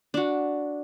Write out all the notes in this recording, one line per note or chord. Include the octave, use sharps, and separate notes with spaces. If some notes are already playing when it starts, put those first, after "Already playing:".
D4 F#4